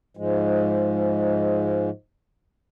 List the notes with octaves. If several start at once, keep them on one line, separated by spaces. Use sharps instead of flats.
G#2 F3 G#3